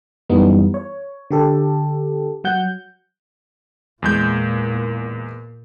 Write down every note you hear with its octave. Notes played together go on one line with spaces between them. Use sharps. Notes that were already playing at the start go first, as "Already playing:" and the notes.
F#2 E3 G3 B3 D#4
C#5
D3 G4 A4
F#3 F#5 G6
E2 A#2 G#3 A#3 G6